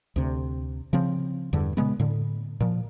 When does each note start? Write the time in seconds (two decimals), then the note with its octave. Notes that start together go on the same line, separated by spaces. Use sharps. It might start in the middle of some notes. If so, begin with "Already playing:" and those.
0.16 D2 C3
0.93 C#3 F3 C4
1.53 E2 G2 D3
1.77 A#2 C#3 G#3 B3
1.99 A2 D3
2.60 A#2 F3